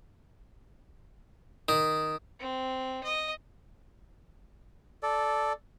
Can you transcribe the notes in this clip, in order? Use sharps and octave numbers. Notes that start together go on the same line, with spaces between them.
D#3
C4
D#5
A4 D5